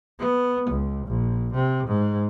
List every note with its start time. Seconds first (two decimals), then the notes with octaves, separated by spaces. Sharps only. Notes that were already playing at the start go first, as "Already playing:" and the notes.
0.19 B3
0.70 C#2
1.07 A#1
1.54 C3
1.87 G#2